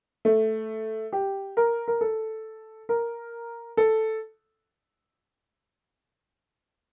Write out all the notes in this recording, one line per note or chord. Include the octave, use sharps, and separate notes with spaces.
A3
G4
A#4
A#4
A4
A#4
A4